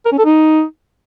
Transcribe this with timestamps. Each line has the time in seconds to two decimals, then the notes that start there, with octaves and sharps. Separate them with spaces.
0.05 A#4
0.12 C#4
0.18 A4
0.25 D#4